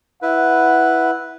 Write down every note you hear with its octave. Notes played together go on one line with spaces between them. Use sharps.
E4 B4 F#5